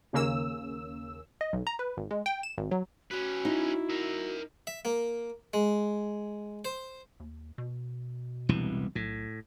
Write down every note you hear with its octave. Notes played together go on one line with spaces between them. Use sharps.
D#2 C#3 A#3 C#4 E6
D#5
B1
A#5
B4
G#1
G#3
G5
E7
G#1
F#3
C#4 F#4 B4
D#4 E4
A#4 E5
E5
A#3
G#3
C5
D#2
B2
E1 C2 E3
B1 A2